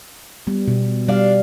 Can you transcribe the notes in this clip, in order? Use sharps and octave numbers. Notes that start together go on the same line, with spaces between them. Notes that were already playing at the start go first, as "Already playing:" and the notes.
G3 B3
B2
G3 D4 F5